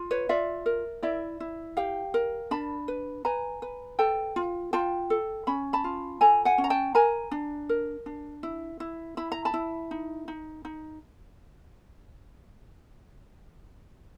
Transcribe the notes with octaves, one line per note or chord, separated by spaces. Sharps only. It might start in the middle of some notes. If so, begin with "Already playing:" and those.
Already playing: F4
B4 C#5
F4 D5 E5
A#4
E4 D5 E5
E4
G4 F5 G5
A#4
D4 A5 B5
B4
B4 G#5 A#5
B4
A4 G5 A5
F4
F4 G5 A5
A4
C#4 B5
A5 B5
F4
A4 G#5 A#5
F#5 G#5
C#4
A#5
G5 A5
A#4 G#5 A#5
D4
A#4
D4
E4
E4
E4 B5
A#5
A5 B5
E4
D#4
D#4
D#4